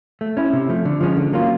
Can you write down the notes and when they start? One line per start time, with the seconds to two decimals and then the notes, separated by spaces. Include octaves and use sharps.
0.21 A3
0.37 C#4 E4
0.53 C3
0.69 F3 A3
0.85 D3
1.01 F3 G#3 C#4
1.17 D3
1.33 F#3 A#3 C#4 F4